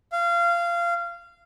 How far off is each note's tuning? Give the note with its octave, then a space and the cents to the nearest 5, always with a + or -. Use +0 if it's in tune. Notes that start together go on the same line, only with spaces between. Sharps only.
F5 -25